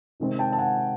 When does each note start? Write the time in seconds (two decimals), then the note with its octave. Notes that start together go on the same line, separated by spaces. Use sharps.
0.20 C3 D#3 G#3 C4
0.39 G5 A5
0.52 A5
0.58 F#5 G#5